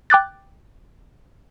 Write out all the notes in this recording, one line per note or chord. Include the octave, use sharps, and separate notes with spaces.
G5 D6 F#6 A6